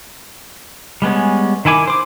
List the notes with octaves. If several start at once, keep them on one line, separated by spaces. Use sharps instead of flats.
G3 G#3 B3 C#4
D#3 E4 G#5 D6
C5 D6